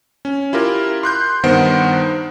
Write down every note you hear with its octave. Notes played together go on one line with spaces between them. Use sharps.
C#4
E4 F4 G4 A#4
C6 F#6 G6
G2 D#3 B3 C5 F#5 D7